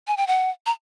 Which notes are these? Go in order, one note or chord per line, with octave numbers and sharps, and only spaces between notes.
G#5
G5
F#5
A#5